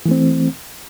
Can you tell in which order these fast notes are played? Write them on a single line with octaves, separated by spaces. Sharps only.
E3 A3 C4